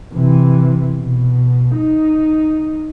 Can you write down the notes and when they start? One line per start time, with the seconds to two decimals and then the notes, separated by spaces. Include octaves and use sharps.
0.14 C3 E3
0.97 B2
1.77 D#4